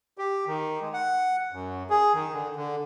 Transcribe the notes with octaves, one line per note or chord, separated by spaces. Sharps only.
G4
D#3
G#3
F#5
F#2
G#4
D#3
D3
D3